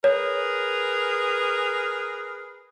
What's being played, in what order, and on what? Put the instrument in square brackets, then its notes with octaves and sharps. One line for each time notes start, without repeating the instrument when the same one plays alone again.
[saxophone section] G#4 A#4 B4 [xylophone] C#5